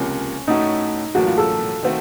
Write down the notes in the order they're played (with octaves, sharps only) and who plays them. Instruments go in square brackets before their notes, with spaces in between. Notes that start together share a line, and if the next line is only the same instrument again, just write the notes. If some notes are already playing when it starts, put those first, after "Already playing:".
Already playing: [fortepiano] C#2 C3 F3 A#3 [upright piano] C#4
[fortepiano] A2 A3 C#4 F#4 [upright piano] D#4
[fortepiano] A1 A2 F#3 A#3 [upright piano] F#4
[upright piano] F4
A4
[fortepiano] D#3 A3 C4 F#4